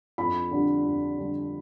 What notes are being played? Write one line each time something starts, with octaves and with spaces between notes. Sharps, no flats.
F2 B5
D3 G3
F2
D3 G3